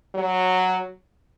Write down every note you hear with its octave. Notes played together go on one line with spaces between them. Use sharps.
F#3